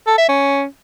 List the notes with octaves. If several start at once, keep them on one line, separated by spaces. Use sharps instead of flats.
A4
E5
C#4